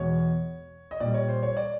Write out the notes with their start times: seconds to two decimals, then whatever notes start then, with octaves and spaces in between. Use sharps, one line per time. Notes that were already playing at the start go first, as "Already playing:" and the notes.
Already playing: E2 B2 G#3 C#5
0.91 D#5
1.00 A#2 G3 D5
1.14 C#5
1.29 C5
1.43 C#5
1.57 D5